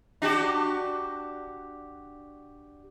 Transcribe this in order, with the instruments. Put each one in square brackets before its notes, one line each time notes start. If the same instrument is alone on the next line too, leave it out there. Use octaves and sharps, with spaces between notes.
[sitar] D4 F#4 G4